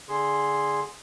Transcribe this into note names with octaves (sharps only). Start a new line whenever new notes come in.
D3 G#4 C6